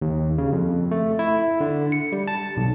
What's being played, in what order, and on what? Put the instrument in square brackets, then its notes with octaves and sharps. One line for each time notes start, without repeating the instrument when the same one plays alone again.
[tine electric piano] D#2
C#3
F2
A3
E4
D3
C#7
G3
A5
B1